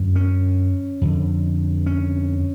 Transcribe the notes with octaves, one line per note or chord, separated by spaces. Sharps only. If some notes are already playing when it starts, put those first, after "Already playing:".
Already playing: F#2 D3
C#4
F2 D3
C#4